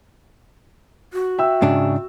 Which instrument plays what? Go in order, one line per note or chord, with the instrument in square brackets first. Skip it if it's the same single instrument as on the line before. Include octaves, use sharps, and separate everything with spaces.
[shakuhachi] F#4
[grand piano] E5 G5 E6
[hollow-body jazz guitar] G#2 C#3 D4